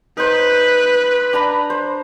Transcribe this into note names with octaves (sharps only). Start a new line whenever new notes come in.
D#4 B4 C5
D4 A#5 B5
C5